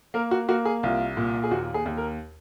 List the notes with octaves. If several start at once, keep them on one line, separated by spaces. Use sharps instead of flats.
A#3 A#4
F#4
A#3 F#4
G#4
C2 F4
A#2
G#4
D#2 F#4
G#4
D#2
A#4